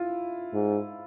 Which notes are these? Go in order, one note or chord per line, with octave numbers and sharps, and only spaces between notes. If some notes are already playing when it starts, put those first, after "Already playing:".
Already playing: E4 F4
G#2